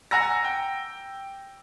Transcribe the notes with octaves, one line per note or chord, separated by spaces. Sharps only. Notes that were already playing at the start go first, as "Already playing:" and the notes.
F#5 G#5 A#5 E6 A#6
G5